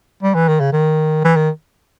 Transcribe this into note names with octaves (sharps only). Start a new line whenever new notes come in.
G3
E3
D#3
C#3
D#3
E3
D#3